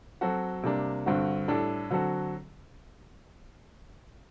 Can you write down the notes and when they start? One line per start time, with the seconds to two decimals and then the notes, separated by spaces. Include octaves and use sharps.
0.21 F#3 C4 F#4 A4
0.63 C3 G3 A#3 D4
1.06 G2 D3 G3 C4 F#4
1.48 A2 G3 D4 A4
1.90 D3 F#3 C4 F#4 A4